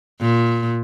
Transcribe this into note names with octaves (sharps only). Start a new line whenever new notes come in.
A#2